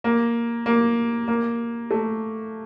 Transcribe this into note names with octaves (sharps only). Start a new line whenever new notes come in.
A#3
A#3
A#3
A3